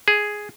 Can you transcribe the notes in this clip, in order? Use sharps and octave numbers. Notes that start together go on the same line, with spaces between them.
G#4